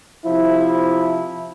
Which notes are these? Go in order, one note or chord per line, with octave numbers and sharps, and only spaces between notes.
C3 F3 E4